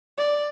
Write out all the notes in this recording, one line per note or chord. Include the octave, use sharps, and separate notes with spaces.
D5